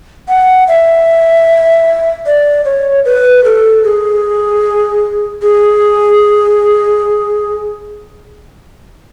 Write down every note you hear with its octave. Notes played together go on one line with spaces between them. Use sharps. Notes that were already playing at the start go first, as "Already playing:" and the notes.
F#5
E5
D5
C#5
B4
A4
G#4
G#4